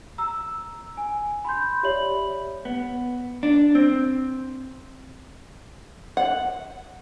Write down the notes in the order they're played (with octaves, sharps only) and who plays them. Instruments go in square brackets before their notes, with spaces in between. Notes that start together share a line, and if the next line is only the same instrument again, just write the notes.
[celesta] A#5 E6
G#5
B5 C6 G6
G4 C#5 D5 E5 B5 F#7
[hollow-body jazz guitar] B3
D4
C4
[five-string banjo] F#5